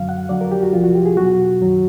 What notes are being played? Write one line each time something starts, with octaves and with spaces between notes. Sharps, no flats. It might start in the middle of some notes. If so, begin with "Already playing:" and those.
Already playing: F#2 D3 F#3 F5
F#5
F2 D3 F#3 D5
A#4
G4
F#4
C2 C3 F3 F4
F#4
G4
G#4
E2 B2 F#3 F#4
F#2 D#3 F#3